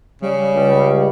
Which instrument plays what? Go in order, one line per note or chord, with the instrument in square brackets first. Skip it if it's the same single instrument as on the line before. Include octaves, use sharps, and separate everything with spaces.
[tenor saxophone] C#3 [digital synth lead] G3
[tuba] C#2 [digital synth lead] G3